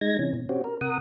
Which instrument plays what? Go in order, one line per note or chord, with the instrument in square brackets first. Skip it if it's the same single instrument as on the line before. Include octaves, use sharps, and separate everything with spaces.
[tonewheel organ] G#3 D#4 G#6 A#6
C3 E3 C#4
B2
C4 C#4 F#4 G4
A#4
C3 A#4 F#5 D#6